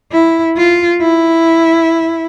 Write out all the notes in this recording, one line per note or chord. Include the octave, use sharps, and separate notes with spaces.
E4
F4
E4